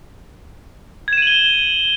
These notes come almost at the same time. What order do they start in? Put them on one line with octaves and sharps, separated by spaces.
G#6 E7 D#7 F#7 G7